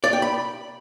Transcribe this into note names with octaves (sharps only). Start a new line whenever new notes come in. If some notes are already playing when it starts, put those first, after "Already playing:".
D5
G5
B5